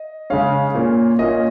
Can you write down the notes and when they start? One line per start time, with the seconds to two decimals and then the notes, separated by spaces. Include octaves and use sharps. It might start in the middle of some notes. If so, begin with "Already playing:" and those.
Already playing: D#5
0.30 C#3 G#3 C#4 F5
0.74 A#2 A#3 C#4
1.19 A#2 A#3 C#4 D#5